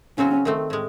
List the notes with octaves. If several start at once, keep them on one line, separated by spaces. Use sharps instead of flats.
C#3 F#3 C4 C#4 F#4
D#3 A3 C4
A2 G#3